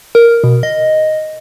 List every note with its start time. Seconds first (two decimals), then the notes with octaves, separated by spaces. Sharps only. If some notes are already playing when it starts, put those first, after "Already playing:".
0.15 A#4
0.44 B2
0.63 D#5